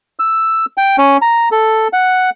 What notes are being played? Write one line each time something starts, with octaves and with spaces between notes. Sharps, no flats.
E6
G5
C#4
A#5
A4
F#5